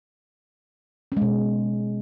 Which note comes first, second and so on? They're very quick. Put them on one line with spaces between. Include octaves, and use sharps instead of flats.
C#4 G#3 B2